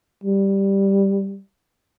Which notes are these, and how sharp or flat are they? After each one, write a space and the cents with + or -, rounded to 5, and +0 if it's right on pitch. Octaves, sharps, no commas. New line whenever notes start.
G3 +0